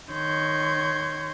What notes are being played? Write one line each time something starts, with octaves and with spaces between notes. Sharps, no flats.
D#3 C#5 C6 G6 G#6